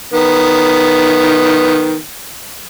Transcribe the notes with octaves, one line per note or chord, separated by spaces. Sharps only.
D#3 B3